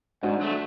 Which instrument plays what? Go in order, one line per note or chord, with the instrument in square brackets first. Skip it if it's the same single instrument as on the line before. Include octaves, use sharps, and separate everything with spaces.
[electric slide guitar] G#2 [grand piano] D4 F#4
[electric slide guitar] F#3 A3